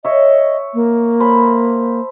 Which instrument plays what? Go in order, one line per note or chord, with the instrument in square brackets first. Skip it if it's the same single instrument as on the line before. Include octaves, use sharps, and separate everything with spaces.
[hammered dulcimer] C#5 E5 [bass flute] D#5
[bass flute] A#3
[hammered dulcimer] C5 A5 B5